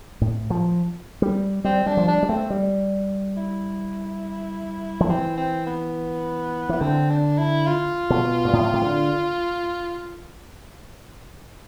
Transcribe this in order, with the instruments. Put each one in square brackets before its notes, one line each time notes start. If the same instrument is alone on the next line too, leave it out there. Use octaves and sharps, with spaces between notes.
[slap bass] A2
F3
G3
[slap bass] G3 [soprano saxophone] C4
[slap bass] G3 [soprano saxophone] D4
[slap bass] F3
[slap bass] G3 [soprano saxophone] D4
[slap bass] G3
[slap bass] A3 [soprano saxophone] C4
[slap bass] G3
[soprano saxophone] E4
[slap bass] F3
[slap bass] E3 [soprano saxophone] C4
[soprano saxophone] C4
B3
[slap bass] E3 [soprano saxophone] B3
[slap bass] D3 [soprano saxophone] C4
[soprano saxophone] D4
E4
F4
[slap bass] B2
G2
A2
C3
D3